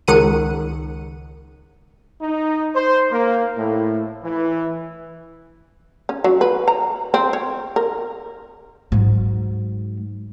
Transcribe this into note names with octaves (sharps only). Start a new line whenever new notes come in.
C#2 D#3 F#5 C#7 D#7
D#4
C5
A#3
A2
E3
C#4
F#3
B4
A#5
C4
C#5
A#4
G#2 F#3